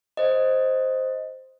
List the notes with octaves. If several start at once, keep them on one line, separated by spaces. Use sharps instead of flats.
C5 D#5